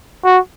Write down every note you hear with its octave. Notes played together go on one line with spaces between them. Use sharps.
F#4